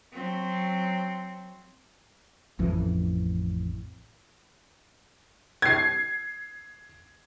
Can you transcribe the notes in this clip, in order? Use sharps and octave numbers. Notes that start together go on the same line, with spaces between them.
F#3 C4
A1 F2 E3
G#6 C7